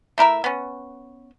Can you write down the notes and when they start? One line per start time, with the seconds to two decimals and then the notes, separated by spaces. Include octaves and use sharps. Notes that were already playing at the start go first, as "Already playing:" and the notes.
0.18 A3 E4 A#4 E5
0.44 B3 C#4